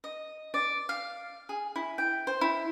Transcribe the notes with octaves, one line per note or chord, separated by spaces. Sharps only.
D#5
D5
F5
G#4
E4
G5
C5
E4